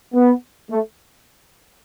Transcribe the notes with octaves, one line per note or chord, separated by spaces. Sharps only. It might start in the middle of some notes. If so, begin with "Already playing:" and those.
B3
A3